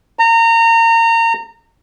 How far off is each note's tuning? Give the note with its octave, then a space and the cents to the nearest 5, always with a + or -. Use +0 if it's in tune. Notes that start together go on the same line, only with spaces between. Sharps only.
A#5 -30